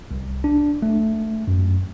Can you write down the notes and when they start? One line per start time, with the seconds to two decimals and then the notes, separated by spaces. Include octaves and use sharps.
0.11 C2
0.44 D4
0.82 A3
1.48 F#2